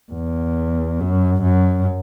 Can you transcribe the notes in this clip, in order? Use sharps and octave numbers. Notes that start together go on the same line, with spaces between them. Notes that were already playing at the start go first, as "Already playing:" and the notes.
E2
F#2
F#2